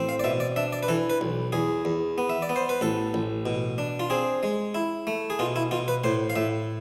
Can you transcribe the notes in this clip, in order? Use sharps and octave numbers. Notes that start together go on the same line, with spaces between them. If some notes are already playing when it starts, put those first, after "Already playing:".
Already playing: A1 C4
F5
D5
B2 E5
D5
D4 E5
D5
B4
E3 A4
B4
B1
E2 G#4
E2
B3
E5
D5
B3
C5
B4
A1 A4
A1
B2
D4
F4
C4 G#4
G#3
E4
A3
G#4
B2 F4
E4
B2 F4
B4
A2 C5
F5
A2 E5